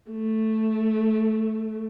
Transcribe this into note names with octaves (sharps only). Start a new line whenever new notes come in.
A3